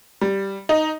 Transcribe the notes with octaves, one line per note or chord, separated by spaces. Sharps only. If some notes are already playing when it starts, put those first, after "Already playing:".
G3
D#4